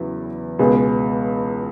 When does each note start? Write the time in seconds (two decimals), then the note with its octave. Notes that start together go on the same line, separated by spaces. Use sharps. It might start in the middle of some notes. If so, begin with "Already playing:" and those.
Already playing: E2 C#3 F#3 E4
0.59 C#2 B2 G#3 B3 G#4